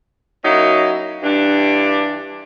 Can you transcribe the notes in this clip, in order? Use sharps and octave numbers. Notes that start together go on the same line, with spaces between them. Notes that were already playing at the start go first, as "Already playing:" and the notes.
F#3 A#3 C#4 D#4 E4
G2 E3 D4